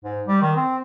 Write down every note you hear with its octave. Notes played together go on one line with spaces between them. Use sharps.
G#2
G3
D#3
C4